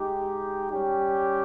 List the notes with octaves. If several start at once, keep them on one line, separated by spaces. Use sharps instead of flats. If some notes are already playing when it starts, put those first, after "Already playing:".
Already playing: G#3 D#4 G4
G3 C#4 G4